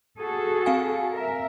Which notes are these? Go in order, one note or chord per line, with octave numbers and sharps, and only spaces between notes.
F#4 G#4 A4
C4 F5 G#5
A#4 E5